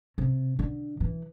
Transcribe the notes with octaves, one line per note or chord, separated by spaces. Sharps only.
C3
D3
E3